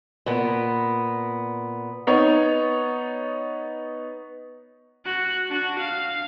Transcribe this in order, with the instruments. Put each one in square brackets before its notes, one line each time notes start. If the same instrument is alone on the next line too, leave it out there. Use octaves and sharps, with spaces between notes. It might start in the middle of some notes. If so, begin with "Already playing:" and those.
[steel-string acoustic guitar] A#2 B3
[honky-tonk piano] B3 D#4 C#5
[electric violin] F#4 F#6
D4 F#4
F5